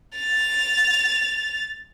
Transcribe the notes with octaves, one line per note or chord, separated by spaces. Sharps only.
A6 F7